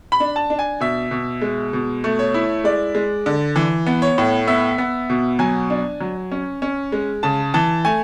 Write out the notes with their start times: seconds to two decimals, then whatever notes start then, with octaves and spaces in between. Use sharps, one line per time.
0.12 B5
0.20 D4
0.36 A5
0.50 D4
0.59 G#5
0.80 B2 E5
1.11 B2
1.42 G#3
1.73 B2
2.04 A3
2.19 C#5
2.34 E4
2.64 G#3 D5
2.95 G#3
3.26 D3
3.56 E3
3.86 B3
4.02 C#5
4.18 A2
4.47 B3 E5
4.78 B3
5.10 B2
5.39 F#3 G#5
5.70 D4
6.00 F#3
6.32 C#4
6.62 C#4
6.92 G#3
7.23 C#3 A5
7.54 E3 A5
7.85 A3 G#5